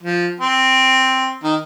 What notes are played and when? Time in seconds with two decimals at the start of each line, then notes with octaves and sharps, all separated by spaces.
0.03 F3
0.40 C4
1.44 D#3